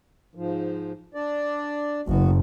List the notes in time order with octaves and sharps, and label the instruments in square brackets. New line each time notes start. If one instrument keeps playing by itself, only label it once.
[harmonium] G#2 F3
D4 D5
[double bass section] F#1 [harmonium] B3 F#4